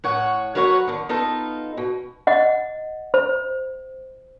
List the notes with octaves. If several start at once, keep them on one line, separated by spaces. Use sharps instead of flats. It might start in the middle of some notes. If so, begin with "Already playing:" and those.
A2 C#5 F#5
F#3 A#4 B4 C#5 E5 F#5
D3 D#3
B3 D#4 F4 A4 F5
B2
D#5 F#5
C5